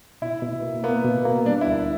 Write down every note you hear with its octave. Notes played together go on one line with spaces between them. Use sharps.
B2 E4
B2
A#3
A#3 B3
B2
A#3
G3 D4
E4
D2